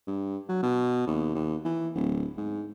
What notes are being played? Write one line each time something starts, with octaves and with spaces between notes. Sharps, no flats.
G2
F#3
B2
D#2
D#2
E3
D1
G#2